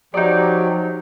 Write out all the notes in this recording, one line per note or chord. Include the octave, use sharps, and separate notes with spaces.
F3 F#3 D#4 G4 D5